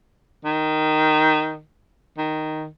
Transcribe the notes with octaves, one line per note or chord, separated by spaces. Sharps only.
D#3
D#3